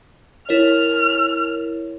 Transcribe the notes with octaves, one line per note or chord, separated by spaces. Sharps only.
E4 A#4 C#5 F6